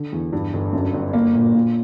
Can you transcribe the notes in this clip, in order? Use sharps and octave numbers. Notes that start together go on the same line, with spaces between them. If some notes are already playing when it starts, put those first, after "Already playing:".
Already playing: D3
E2
G2
G1
F#2
G1
A#3
A#2
A#2